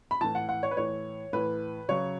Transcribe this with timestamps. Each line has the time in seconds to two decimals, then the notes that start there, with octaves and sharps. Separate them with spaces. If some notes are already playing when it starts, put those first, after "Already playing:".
0.11 B5
0.21 A2 E3 A5
0.35 F#5
0.49 F#5
0.63 C#5
0.71 B4
0.77 A2 E3 C#5
1.33 A2 E3 B4
1.89 C#3 F#3 C#5